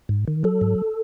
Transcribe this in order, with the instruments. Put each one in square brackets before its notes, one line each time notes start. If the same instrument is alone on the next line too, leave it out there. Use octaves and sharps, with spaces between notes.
[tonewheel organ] G#2
D#3
F#3 A4
G#2